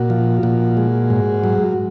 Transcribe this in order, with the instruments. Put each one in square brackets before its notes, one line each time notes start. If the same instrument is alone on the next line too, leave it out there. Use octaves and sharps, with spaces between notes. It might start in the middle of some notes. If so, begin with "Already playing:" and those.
Already playing: [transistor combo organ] A#2 F#4
F3
A#2 F#4
G#3
G#2
F#3